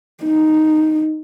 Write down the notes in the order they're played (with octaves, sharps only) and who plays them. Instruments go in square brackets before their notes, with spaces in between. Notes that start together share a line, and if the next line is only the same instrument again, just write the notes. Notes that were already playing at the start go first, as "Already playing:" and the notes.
[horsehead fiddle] D#4